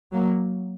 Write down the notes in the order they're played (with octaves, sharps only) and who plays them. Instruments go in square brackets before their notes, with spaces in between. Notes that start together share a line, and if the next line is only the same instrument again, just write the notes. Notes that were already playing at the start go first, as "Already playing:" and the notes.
[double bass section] F#3 A#3